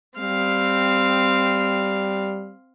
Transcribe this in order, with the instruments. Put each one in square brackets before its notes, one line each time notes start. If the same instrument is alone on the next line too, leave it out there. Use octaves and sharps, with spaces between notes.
[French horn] G3 [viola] C4 F5